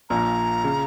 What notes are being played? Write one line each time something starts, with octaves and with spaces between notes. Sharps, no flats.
A#1 A#2 A#3 A#5
C#3